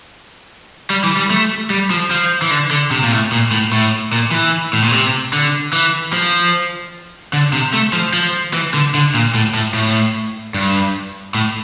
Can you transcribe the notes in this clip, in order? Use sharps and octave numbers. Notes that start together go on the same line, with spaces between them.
G3
E3
G3
A3
G3
F3
F3
E3
D3
D3
C3
A#2
A2
A#2
A2
A2
A#2
E3
A2
A#2
C3
D3
E3
F3
D3
C3
A3
F3
F3
E3
D3
D3
A#2
A2
A2
A2
G2
A2